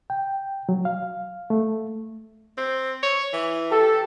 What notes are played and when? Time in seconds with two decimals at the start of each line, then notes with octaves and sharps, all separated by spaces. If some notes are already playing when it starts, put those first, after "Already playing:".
0.10 G5
0.69 F#3
0.85 F5
1.50 A3
2.58 C4
3.03 C#5
3.33 E3
3.71 G4 A4